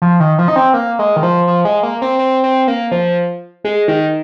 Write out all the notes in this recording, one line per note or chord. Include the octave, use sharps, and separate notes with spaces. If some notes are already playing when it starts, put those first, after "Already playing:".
F3
D#3
F3
D#4
C4
A#3
G#3
D#3
F3
F3
G#3
A#3
C4
C4
C4
A#3
F3
G#3
D#3